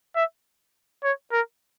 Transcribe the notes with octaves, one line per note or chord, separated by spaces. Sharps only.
E5
C#5
A#4